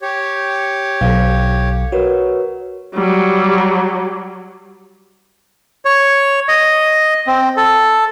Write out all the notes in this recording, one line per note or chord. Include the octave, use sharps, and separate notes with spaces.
G4 C#5
B1 A4 F5
F#4 A#4 B4 C#5
F#3 G3
C#5
D#5
C4
A4